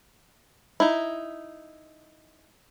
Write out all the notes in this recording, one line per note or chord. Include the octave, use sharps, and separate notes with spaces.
D#4 E4